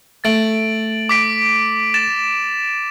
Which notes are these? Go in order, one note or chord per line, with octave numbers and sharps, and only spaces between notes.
A3 A6 D7 F#7
D6 B6 D7
A6 E7